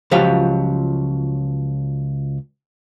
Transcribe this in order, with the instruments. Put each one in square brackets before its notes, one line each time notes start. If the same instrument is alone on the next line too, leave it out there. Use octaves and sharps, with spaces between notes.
[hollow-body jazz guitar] C#2 F3 F#3 G4 F5